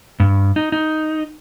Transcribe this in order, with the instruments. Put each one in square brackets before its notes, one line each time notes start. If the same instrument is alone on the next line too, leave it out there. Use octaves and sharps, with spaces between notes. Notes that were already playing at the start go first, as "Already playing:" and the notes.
[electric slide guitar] G2
D#4
D#4